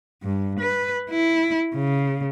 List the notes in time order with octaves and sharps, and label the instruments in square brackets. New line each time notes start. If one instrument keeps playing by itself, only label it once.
[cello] G2
B4
E4
C#3